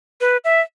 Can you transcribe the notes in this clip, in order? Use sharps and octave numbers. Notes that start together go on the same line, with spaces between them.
B4
E5